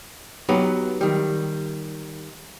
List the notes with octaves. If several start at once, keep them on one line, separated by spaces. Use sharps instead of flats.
F#3 B3 D#4 G4 B4
D#3 G3